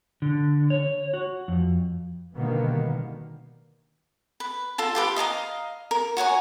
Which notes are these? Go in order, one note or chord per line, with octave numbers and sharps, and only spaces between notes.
D3
C#5
F#4
F2
B2 D3 D#3 G3 A#3 B3
B4
F4 A4 A5
F4 G4 B4
D#5 F5 A5 A#5
A#4
F#4 C#5 F#5 G#5